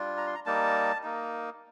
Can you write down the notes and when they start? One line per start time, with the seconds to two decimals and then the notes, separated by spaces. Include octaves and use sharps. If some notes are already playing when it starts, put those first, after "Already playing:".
Already playing: G3 D4 F4
0.17 A#5
0.27 C6
0.35 A#5
0.46 G3 A#3 D#4 A5
1.03 A#3 D#4